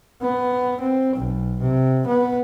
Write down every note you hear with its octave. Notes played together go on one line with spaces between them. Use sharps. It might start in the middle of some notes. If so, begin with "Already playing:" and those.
B3
C4
B1
C3
B3